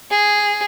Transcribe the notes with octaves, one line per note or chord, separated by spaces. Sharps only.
G#4